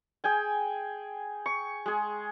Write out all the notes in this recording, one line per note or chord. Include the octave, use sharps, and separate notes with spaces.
G#4 G5 G#5
C#6
G#3 G#4